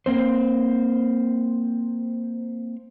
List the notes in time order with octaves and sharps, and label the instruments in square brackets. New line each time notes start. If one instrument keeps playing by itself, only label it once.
[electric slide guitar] A#3 C4 C5